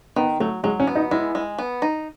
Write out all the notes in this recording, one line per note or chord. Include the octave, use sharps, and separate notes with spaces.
D#3 B3
F#3 A3
F#3 G#3
C#4
B3
D#4
G#3 E4
G#3
B3
D#4